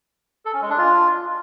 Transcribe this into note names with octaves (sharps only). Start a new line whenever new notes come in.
A4
C#4
G#3
D4
F4